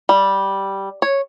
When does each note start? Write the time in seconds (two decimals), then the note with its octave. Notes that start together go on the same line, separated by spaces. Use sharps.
0.09 G3
1.02 C#5